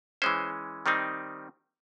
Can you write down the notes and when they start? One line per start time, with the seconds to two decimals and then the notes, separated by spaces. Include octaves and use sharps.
0.22 E3 G#3 C#4 C5
0.86 D#3 G3 C4 D#4